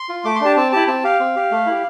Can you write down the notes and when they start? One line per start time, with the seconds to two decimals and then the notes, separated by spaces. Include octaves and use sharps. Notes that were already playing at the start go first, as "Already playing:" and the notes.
Already playing: C6
0.09 F4
0.25 A3 D6
0.35 C6
0.41 D4 G4 A5
0.56 C4 A5
0.72 E4 G4 A5
0.87 C4 A5
1.04 G4 F5
1.20 C4
1.36 G4
1.51 A3
1.66 E4 G4